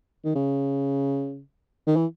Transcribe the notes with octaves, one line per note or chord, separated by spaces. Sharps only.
D#3
C#3
D#3
E3